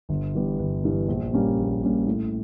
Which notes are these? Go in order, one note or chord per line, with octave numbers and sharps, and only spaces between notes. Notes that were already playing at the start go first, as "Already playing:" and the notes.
G1
G2 E3 G3 B3
G1
G2 E3 G3 B3
A#1
A#2 G3 A#3 C#4
A#1
A#2 G3 A#3 C#4
A2